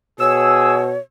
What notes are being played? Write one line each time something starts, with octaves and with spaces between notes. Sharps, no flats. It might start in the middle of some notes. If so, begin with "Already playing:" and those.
B2 G#4 C#5 E6